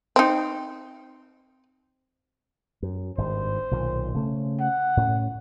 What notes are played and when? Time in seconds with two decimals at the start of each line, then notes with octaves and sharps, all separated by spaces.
0.16 C4 D#4
2.83 F#2
3.18 G#1 G2 C5
3.71 B1 A#2 D#3
4.14 C#3 A3 C#4
4.61 F#5
4.97 A2 C#4